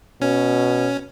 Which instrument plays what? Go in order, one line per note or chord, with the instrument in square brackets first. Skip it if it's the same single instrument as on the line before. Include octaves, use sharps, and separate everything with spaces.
[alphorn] B2 [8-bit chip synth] C#4